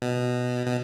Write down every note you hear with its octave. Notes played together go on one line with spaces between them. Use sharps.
B2
B2